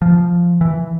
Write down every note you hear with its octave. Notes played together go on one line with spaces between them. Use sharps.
F3
E3